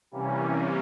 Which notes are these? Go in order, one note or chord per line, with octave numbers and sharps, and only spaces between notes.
C3 E3 G3 A#3 C#4